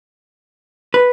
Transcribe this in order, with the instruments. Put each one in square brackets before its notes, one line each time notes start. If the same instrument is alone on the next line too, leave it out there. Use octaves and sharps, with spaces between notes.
[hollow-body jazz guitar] B4